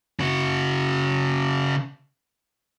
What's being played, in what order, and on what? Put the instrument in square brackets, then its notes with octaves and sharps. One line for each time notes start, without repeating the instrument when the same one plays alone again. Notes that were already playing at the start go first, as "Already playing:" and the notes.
[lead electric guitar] C#3 F#4